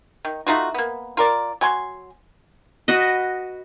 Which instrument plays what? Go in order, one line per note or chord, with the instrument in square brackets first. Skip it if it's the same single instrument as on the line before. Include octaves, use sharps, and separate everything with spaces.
[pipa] D#3
A3 D#4 F4 F#4
A#3 B3
F4 A#4 D5
F#3 G#5 C6
[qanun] F#4 B4 D#5